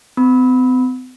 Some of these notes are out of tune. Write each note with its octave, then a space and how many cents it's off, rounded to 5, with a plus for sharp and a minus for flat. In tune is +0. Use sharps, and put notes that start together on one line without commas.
C4 -45 B5 +0 E6 -35